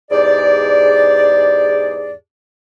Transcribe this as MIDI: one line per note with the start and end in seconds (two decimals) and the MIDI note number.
0.11 2.13 40
0.11 2.13 44
0.11 2.13 67
0.11 2.13 68
0.11 2.13 74